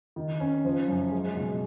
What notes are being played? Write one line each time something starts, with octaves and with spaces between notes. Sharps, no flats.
D#3
C#4
F3
F#2
G#3
B2